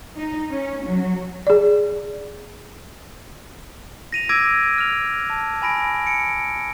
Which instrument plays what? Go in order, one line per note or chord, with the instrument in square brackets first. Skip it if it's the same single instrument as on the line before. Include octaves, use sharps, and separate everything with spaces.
[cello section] D#4
C#4
F#3
[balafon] G#4 D5
[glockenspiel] A#6 D#7 F7
D6 E6 G#6 A#6 D7
F6 F7
A5
G#5 B5 A#6 D7
C#7 D7